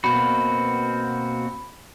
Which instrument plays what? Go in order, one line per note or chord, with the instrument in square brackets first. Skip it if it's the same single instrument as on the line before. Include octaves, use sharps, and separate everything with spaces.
[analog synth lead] B2 [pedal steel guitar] A#3 C4 F#4 [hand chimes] B5